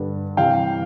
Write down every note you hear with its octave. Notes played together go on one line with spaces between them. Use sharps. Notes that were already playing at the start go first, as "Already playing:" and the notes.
Already playing: G2 D3 G3 B3
C3 E3 G3 C4 F5 G5